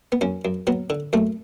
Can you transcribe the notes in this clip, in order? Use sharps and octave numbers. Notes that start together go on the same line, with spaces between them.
B3
F#2 C#4
F#2
F#3 B3
D3
F#2 A3